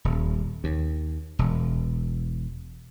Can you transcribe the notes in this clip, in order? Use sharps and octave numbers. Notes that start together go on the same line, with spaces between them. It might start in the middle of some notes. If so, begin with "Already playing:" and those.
D#1
D#2
E1